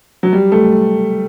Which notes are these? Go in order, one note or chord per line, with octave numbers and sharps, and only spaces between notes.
F#3
G3
A3